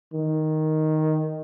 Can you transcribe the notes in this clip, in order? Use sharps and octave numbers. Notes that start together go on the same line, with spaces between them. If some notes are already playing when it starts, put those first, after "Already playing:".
D#3